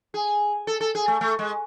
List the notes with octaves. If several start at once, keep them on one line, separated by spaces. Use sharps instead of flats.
G#4
A4
A4
G#4
A3
A3
G#3